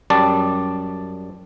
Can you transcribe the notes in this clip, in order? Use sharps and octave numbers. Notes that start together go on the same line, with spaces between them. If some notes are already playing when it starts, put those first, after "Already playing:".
F#2 G3 D5 A5